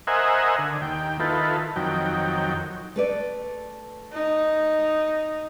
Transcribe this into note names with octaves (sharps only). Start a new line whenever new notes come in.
A#4 C5 D#5 E5 F#5 G#5
D3
D#2 G5
D#3 E4 F4 A4 B4
F2 D#3 F#3 G5
A3 B4 D5
D#4